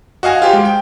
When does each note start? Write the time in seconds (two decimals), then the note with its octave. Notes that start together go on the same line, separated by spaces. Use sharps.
0.23 F#4 D#5 F5 G#5
0.42 F4 G4 C5
0.53 G#3
0.65 G5